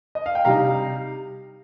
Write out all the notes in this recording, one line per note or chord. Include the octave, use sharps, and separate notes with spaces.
D#5
F5
G5
C3 G3 D#4 F5 A#5